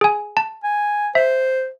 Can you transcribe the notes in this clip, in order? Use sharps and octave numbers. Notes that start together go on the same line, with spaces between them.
G#4 G#5
A5
G#5
C5 E5